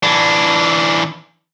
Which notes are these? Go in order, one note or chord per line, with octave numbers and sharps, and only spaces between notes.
E3 D4